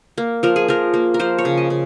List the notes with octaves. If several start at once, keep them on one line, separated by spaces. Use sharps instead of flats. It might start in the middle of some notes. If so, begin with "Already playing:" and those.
A#3
F3 A#4
G#4
F3 A#4
A#3
A#4
F3 C5
C#5
C#3
D#5
C#3